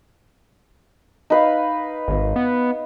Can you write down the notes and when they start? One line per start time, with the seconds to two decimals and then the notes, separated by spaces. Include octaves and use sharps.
1.30 D#4 B4 F5
2.08 G#1
2.36 B3